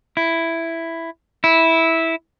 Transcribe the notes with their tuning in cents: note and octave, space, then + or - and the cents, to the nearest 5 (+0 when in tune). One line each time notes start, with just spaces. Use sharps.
E4 +5
E4 -10